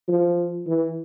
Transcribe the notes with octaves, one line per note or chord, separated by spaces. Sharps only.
F3
E3